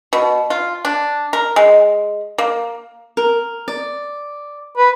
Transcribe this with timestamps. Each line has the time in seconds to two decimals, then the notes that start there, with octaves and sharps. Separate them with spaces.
0.13 B2
0.50 F4
0.85 D4
1.33 A#4
1.56 G#3
2.38 A#3
3.17 A#4
3.68 D5
4.77 B4